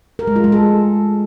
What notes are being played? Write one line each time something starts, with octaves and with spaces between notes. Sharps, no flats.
A#4
G#3
F4
G#3
A4